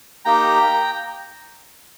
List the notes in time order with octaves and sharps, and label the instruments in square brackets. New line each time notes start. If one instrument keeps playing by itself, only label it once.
[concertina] A#3 D#4 G4 G5 A#5